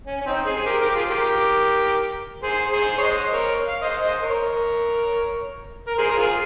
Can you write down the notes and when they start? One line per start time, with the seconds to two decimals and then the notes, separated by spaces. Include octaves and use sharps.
0.06 C#4
0.21 C#4
0.26 C4 D#4
0.46 G#4 C5
0.56 G#4
0.66 G4 A#4
0.80 G4 A#4
0.95 F4 G#4
1.06 C5
1.10 G4 A#4
2.43 G#4 C5
2.73 G#4 C5
2.98 C#5
3.03 C5 D#5
3.32 A#4 C#5
3.68 F5
3.81 C5 D#5
4.01 C5 D#5
4.21 A#4 C#5
5.87 A#4
5.98 G#4 C5
6.11 A#4
6.18 F4 G#4